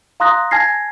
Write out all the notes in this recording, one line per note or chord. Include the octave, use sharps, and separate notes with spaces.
F5 A#5 C6 D#6 F#6 A#6
G#5 A5 F6 G#6 A#6 C7